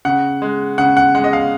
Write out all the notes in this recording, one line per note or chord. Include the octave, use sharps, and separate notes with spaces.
C#3 F#5
G#3
C#3 F#5
F#5
G#3 F#5
D#5
F5